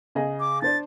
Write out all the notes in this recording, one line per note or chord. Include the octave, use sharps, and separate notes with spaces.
C#3 G#4 D#5
D6
D4 C5 D5 A6